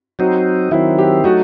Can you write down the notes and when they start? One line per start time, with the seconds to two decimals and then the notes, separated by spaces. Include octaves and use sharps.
0.19 F#3 C4 D#4 F#4
0.71 D#3 F#3 C4 E4
0.98 G4
1.24 F#3 A3 D#4 F#4